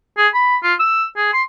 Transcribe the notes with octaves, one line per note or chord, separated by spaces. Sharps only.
G#4
B5
F4
E6
G#4
C6